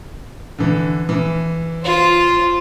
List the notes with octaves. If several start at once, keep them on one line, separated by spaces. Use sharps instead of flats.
D3 E3
E3
F4 C5